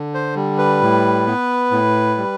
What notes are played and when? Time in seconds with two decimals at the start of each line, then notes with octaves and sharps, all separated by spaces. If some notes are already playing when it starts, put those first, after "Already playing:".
Already playing: D3
0.14 C5
0.36 G3
0.58 B4
0.81 A2
1.27 B3
1.71 A2
2.17 G3